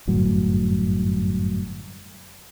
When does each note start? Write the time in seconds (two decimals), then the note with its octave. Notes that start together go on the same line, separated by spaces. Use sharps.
0.07 G1 F#2 A2 F#3